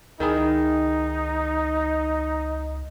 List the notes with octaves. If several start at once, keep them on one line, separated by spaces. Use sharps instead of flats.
C#2 D#3 D#4 E4 G#4